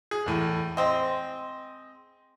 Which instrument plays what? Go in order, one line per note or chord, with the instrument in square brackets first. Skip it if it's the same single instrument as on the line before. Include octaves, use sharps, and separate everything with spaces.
[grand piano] G#4
E2 A2
[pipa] G#3 C4 [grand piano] D#5